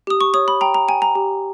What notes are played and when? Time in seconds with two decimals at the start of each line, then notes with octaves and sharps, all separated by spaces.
0.07 G4 D#6
0.21 C#6
0.34 C#5 D#6
0.48 B5
0.61 G5 A#5
0.74 A#5
0.88 G5 G#5
1.02 A#5
1.15 G4